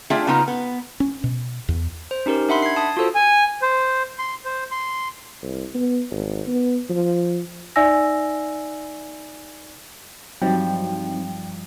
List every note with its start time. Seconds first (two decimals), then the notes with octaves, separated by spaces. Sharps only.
0.10 A3 D4 F4 G#4 E5 G5
0.27 C#3 A#3 B3 D#4 F4 F#5
0.48 B3
1.00 C#4
1.24 B2
1.69 E2
2.11 C5
2.26 C#4 D#4 G4 A#4
2.49 D4 E5 F#5 B5 C6
2.63 G#6 C7
2.76 A5 D#6
2.97 F4 F#4 A4 C5
3.15 G#5
3.62 C5
4.19 C6
4.45 C5
4.71 C6
5.43 C2
5.74 B3
6.10 G#1
6.47 B3
6.89 F3
7.76 D#4 D5 E5 G#5 E6 A#6
10.42 G2 F3 F#3 C4 D#4 G5